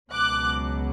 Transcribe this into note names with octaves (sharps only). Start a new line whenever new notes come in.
C#2 B2 F#3 D6 F#6